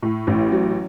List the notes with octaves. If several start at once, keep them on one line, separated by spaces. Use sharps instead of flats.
A2
A1
F#3